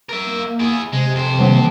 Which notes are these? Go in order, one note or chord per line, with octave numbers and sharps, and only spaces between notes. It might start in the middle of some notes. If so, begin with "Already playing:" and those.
A#4 E5
A#3
E4 G#4
C3 G#3
F2 C5
D#3 E3 A#3